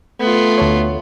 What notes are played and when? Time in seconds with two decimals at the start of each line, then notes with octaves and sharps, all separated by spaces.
0.20 A3 B3 F4
0.58 D2 A4 C#5